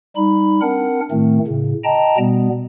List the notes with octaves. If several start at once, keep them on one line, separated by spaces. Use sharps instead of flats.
G3 D#4 B5
C4 D4 A#4 F#5
A2 D#3 A3 C4
A2 C#3
D#5 G5 A5 A#5
B2 G3 B3